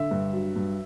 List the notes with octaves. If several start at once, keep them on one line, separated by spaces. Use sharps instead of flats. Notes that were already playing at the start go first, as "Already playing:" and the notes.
Already playing: D3 E5
G2
F#3
G2